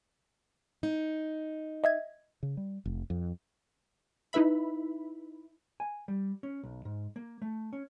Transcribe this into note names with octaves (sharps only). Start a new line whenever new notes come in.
D#4
D#5 E5 G#6
C#3
G3
F1
F2
D#4 E4 B4 E5 B5
G#5
G3
C#4
B1
G#2
A#3
A3
C#4